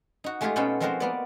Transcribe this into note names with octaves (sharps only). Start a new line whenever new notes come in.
D#4 F#4
G#3 A3 D#4 F4 G4 G#4
B2 B3 C#4 A4 C5 G5
F3 G#3 C4 F#4 A#4 C5
A#3 B3 D5